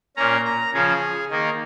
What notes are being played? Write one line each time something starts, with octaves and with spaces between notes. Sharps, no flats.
A#2 A#3 C#4 A#5
A#5
C#3 F3 C#4 G#4
D#3 A#3 D#4